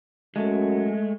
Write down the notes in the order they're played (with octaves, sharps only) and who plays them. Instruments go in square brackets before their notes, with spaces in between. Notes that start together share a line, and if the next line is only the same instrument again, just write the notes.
[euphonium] F#2 [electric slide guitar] G#3 A3